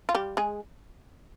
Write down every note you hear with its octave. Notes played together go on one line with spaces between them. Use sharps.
F4
G3 G4
G#3 G#4